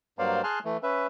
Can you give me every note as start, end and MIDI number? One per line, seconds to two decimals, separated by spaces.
0.19 0.42 43
0.19 0.42 54
0.19 0.42 58
0.19 0.42 72
0.19 0.42 74
0.19 0.42 77
0.44 0.59 68
0.44 0.59 80
0.44 0.59 81
0.44 0.59 84
0.44 0.59 89
0.44 0.59 90
0.65 0.77 52
0.65 0.77 57
0.83 1.07 61
0.83 1.07 71
0.83 1.07 76